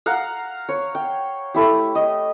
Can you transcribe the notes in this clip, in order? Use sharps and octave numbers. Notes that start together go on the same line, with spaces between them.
F5 F#5 A#5
C#5
G5
A3 E4 G4
D#5